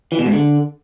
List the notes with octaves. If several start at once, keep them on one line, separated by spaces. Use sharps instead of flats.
E3
B2
G#2
D3